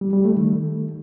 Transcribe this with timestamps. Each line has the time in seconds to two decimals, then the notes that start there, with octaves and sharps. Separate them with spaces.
0.01 G3
0.13 G3
0.25 A3
0.37 D#3